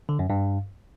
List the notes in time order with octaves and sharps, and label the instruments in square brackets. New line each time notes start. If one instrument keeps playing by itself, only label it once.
[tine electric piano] D3
F#2
G2